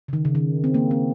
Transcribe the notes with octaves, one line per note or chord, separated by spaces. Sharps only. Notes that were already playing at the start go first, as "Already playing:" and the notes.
C#3
D#3
C#3
D#3
C4
A#3
C4